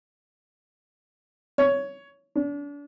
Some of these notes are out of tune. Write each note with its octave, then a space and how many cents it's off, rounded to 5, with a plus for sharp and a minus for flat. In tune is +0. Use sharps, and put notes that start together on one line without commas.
C#5 +10
D4 -35